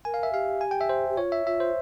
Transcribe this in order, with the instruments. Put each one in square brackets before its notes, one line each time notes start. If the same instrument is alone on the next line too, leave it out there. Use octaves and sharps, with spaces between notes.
[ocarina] A#4 [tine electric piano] G#5
[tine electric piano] F5
E5
[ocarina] G4 [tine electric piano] F5
[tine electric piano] G#5
G5
E5
C5
[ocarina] G4
[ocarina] F4 [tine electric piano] C#5
[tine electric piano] E5
[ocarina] F4 [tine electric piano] E5
[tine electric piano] C5